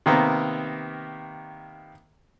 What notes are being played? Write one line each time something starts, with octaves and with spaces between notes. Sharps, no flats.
C3 D#3 A#3 B3